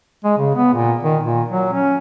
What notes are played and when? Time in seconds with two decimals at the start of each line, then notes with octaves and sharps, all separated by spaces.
0.25 G#3
0.38 C#3
0.55 B3
0.74 A#2
1.03 D#3
1.23 A#2
1.49 F#3
1.73 C#4